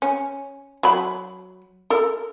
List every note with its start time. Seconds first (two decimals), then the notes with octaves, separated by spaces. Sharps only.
0.02 C#4
0.83 F#3 B5
1.90 A4 A#4